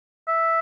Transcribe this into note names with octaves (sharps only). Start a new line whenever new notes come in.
E5